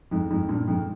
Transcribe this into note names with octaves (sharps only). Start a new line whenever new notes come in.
F2 G#2
F2 G#2
G2 A#2
F2 G#2